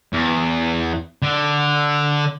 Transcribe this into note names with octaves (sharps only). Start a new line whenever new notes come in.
E2
D3